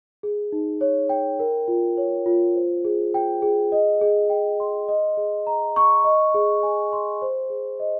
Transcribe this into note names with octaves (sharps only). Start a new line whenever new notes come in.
G#4
D#4
C#5
G5
A#4
F4
C#5
F4
C5
G#4
G5
G#4
D#5
G#4
G5
C6
D#5
G#4
A#5
C#6
D#5
G#4
G#5
C6
C5
G#4
D#5